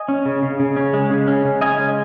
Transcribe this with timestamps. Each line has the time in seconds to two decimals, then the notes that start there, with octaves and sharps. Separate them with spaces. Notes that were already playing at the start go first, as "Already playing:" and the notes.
Already playing: D#5 G#5
0.08 C#4
0.26 C#3
0.43 C#3
0.60 C#3
0.77 C#4
0.93 G#3
1.10 C#3
1.28 C#4
1.45 C#3
1.61 C#4 D#5 G#5
1.79 G#3